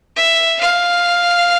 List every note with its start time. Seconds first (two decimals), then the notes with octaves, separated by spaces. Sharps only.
0.16 E5
0.61 F5